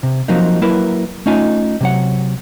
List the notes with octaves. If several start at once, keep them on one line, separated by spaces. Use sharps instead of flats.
C3
F3 F#3 A#3 C4 D#4
F#3 A#3 E4 A#4 B4
A3 C#4 D#4 F4 G#5
C3 F#3 F#5